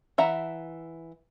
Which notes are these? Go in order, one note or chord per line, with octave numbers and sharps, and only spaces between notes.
E3 E5 F#5 A#5